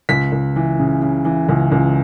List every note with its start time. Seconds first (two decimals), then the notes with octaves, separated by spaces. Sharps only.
0.09 C#2 B6
0.32 C#2
0.56 E3
0.79 C#3
1.02 C#3
1.25 E3
1.49 C#2
1.72 C#2